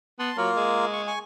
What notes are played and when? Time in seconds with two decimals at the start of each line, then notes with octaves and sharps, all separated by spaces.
0.19 B3 A5 C6
0.37 F#3 A#3 F4 A#4
0.57 G#3
0.93 C#6
1.08 G#5 C#6